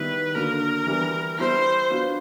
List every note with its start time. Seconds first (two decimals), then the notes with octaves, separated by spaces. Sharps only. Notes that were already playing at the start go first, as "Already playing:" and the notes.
Already playing: D#3 G3 B3 E4 B4
0.35 D3 F#3 A#3 D4 A#4
0.87 E3 G3 B3
1.39 G3 B3 E4 C5
1.90 F#3 B3 D4 F4